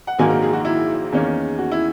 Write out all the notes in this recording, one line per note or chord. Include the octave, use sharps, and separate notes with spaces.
F#5
A#1 G#2 D#3 F#3 A#3 G#5
A#4
G#4
F#4
E4
E2 D#3 A#3 C#4
F#4
E4